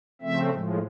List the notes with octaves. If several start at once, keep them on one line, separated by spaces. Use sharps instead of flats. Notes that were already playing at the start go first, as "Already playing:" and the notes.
C#3 F3 A3 C4 E5
A2 F3 G#3